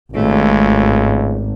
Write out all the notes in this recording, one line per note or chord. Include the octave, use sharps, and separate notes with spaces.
G#1 C#2 A3